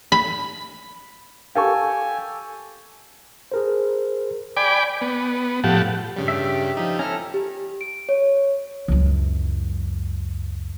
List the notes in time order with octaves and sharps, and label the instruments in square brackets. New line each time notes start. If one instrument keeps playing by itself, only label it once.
[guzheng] B5
[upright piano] G4 A4 [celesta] F5 C#6 [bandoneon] G#5
[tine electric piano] G#4 A#4 C5
[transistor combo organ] D5 G5 G#5 B5 D6
B3
A2 F3 G4 F#5 A5
[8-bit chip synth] G2 C#3 G3
[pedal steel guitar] G4 E5
[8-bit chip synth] F3 D#4
[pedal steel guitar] C#4 E4 A4 [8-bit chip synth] A#5 F6
[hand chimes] G4
D7
C#5
[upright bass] C#2 F#2